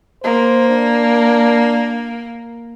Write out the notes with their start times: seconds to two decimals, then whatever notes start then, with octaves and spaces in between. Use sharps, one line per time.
0.24 A#3 C5
0.69 D4